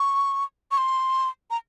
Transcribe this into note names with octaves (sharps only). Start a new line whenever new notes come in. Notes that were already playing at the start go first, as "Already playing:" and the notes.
Already playing: C#6
C#6
C6
A#5